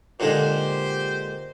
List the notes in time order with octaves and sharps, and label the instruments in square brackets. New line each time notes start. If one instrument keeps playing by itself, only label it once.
[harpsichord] A#2 D3 G#3 [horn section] G4 C5